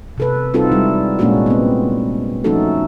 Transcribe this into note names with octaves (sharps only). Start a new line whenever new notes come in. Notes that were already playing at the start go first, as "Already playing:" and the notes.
C3 A4 B4
G3 C4 D#4 F4 F#4 A4
G3 G#3 E4
A#2 G#3 A#3 C#4 D4 F#4
B3 C4
F3 A3 C#4 D#4 F#4 A4